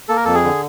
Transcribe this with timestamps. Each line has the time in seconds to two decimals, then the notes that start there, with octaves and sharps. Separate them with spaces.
0.09 A#3 A4
0.16 A#4
0.25 F2 A4
0.34 G#4
0.44 D3